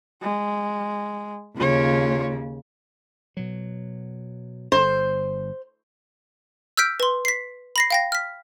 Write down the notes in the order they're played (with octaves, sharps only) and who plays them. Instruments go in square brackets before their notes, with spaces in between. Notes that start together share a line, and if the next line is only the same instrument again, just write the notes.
[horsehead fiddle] G#3
[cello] D#2 C#3 [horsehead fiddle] F4 C#5
[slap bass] B2 F#3
[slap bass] G1 [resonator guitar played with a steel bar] C5
[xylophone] E6 F6 G6 B6 D7
B4 C6
B6 C7
B5 A#6 C7
F5 G5 A#6
F6 B6